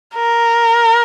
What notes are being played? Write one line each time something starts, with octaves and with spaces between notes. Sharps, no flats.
A#4